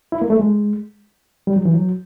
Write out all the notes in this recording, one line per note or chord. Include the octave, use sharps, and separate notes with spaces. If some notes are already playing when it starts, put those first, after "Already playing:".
E4
A#3
A3
G#3
G3
F#3
E3
F#3